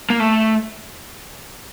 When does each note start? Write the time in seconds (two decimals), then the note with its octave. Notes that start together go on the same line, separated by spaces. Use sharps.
0.10 A#3
0.20 A3